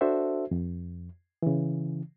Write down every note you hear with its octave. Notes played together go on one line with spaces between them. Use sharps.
D4 F#4 A4 C5 E5
F2
C#3 E3